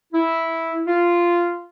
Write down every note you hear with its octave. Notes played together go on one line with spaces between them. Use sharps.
E4
F4